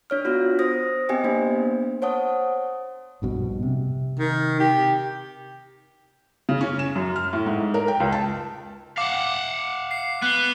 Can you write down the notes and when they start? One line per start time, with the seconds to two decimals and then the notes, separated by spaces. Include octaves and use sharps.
0.10 D4 C#5 F6
0.25 B3 F4 F#4
0.59 C5 D#6 A#6
1.09 B3 C4 G4 D#5 G5 G#5
1.24 A#3 B3 D4 C5
2.02 C5 C#5 F#5 A5 D#6
3.22 A#1 G2 B2
3.63 C3
4.19 D#3
4.60 G4
6.49 C#3
6.61 C#4
6.79 E7
6.95 F#2
7.16 F6
7.33 A2
7.46 G#2
7.74 A#4
7.88 G5
8.00 C#2
8.12 A5
8.98 F5 F#5 D6
9.91 C7
10.22 B3 F#6 C7